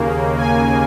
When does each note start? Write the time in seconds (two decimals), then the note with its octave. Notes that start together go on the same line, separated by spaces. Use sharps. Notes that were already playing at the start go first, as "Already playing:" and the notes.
Already playing: D#2 C#3 A#3
0.38 G#5